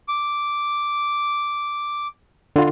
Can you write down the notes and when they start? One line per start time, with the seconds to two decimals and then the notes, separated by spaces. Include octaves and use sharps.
0.08 D6
2.56 D3 F4